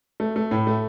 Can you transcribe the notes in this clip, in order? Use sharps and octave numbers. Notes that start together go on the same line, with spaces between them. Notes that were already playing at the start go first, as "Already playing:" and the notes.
A3
A3
A2
A3